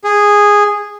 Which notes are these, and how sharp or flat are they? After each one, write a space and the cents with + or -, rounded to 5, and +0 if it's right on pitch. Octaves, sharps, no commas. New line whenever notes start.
G#4 -10